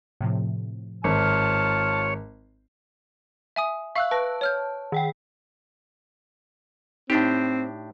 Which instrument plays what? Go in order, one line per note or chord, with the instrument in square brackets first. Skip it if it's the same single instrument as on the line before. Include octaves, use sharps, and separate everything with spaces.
[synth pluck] A2 C3 F3
[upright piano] G#1 [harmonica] F4 A5 F6 [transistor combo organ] C#5
[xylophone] E5 G#5 D#6
[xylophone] E5 F5 [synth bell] C#6 E6 F#6
[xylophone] B4 A#6 [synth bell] A5
[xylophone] C#5 F6 G6
[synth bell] D#3 F#5 G5
[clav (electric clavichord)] A2 D4 G4 [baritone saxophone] C4 [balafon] D#4